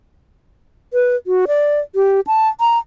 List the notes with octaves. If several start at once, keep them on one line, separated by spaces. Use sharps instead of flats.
B4
F#4
D5
G4
A5
A#5